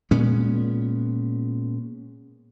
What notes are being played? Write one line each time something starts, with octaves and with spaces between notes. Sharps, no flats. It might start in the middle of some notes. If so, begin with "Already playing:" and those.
A#2 G#3 B3 C#4